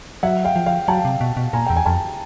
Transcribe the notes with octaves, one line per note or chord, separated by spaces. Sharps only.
F#3 E5 F#5
F5 G5
F3
F5 G5
F#3 G5 A5
C3
B2
B2
A#2 G#5 A#5
E2 G5
G#5
F2 G5 A5